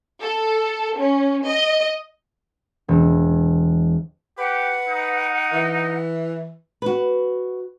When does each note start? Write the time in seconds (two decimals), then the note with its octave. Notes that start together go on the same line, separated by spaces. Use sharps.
0.22 A4
0.97 C#4
1.45 D#5
2.88 E1
4.38 G4 B4 F#5
4.88 D#4
5.52 E3
6.82 F#4 B4